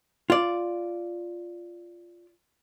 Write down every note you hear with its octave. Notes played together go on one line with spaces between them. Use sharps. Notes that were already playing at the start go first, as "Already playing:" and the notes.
F4 D5